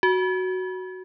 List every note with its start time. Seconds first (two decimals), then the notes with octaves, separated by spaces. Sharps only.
0.03 F#4